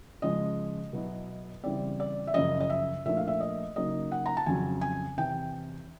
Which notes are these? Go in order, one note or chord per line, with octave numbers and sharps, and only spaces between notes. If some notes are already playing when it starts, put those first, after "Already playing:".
C#3 F3 G#3 D#5
B2 F#3 B3 E4
C#3 E3 G3 C4 D5
D5
E5
F#2 C#3 F3 D#5
D#5
E5
A#2 F3 A3 D4 E5
F5
E5
D#5
C#3 F#3 A#3 D#4 D#5
F#5
A#5
A5
F2 C#3 F#3 G#5
G#5
E2 C3 E3 G5